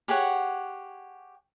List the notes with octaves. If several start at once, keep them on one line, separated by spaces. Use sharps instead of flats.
G4 G#4 C#5 F#5